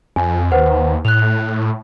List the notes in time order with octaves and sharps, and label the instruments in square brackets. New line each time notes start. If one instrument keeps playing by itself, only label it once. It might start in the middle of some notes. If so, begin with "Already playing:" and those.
[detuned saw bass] F2 [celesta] G#5
[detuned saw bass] D#2 [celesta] B4 C5 F#5
[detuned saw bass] A2 [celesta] F#6 F7